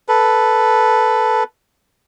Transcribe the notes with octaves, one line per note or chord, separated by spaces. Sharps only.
A4 B4